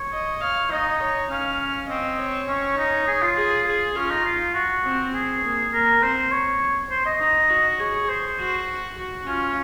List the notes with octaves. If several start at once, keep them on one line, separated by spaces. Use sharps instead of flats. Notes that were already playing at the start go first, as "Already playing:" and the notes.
Already playing: C#5
D#5
C#5 F5
D#4 D#5
C#5
C#4 F5
C4 D#5
C#5
C#4
D#4
G#4
F4
G#4
G#4
C#4 F4
D#4
F4
F#4
C4
G#4
A#3
A#3 A#4
C4 C5
C#5
C5
D#5
D#4 D#5
F#4
G#4 C#5
C5
F#4
F#4
C#4 F4